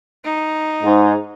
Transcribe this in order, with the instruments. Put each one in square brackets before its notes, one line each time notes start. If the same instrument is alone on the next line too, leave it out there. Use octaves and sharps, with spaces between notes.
[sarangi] D#4
[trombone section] G#2